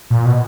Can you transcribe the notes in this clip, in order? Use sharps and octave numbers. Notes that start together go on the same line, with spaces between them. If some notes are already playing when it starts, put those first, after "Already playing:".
A#2
B2